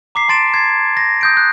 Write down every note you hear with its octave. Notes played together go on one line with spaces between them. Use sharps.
A#5 D6 B6 C7
A5 C6 A6 D7 E7
G#6 C7
A#6
D#6 G6 D7
F#6